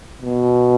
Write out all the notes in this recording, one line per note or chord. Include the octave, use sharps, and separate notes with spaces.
B2